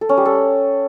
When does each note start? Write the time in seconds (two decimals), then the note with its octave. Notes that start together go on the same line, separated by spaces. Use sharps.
0.01 A4
0.09 C#4
0.17 G3
0.25 A4